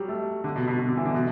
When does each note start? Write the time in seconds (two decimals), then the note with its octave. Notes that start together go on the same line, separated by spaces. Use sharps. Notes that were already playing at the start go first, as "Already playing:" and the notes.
Already playing: F#3 G3
0.09 A3
0.44 D3
0.56 B2
0.67 B2
0.79 B2
0.88 D3
0.97 E3
1.05 D3
1.14 B2